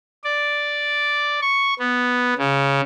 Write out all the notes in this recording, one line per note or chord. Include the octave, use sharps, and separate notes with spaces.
D5
C#6
B3
C#3